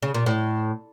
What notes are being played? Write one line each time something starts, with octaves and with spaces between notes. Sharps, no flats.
C#3
A#2
A2